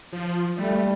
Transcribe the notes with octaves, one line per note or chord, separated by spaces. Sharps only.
F3
G3 A3